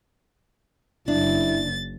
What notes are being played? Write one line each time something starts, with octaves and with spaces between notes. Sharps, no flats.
F#1 D4 E4 A6